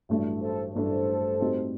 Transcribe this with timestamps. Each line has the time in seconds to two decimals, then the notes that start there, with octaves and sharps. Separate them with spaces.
0.09 A1 G2 F#3 A3 D4
0.41 A4 C5
0.74 A1 G2 F#3 A3 D4 A4 C5
1.40 A2 G3 C4 D#4 F#4